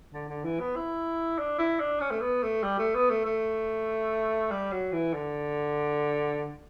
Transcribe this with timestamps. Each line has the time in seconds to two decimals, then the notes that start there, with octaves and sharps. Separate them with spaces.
0.13 D3
0.29 D3
0.44 E3
0.60 B3
0.76 E4
1.39 D4
1.59 E4
1.80 D4
2.00 C#4
2.11 A3
2.22 B3
2.43 A3
2.63 G3
2.79 A3
2.95 B3
3.10 A3
3.25 A3
4.51 G3
4.72 F#3
4.93 E3
5.14 D3